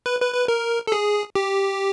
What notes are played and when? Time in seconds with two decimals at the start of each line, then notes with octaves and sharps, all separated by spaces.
0.06 B4
0.21 B4
0.34 B4
0.48 A#4
0.87 A4
0.92 G#4
1.35 G4